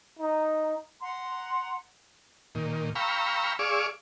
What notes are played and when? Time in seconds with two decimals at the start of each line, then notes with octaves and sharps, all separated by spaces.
0.19 D#4
1.01 F#5 A#5 C6
2.55 A#2 D#3
2.95 F5 G5 A#5 B5 C#6 E6
3.59 G#4 D5 F5 C#6 D6 E6